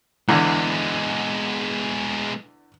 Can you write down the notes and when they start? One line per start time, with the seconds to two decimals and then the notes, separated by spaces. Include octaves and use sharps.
0.29 E2 D3 G#3 B3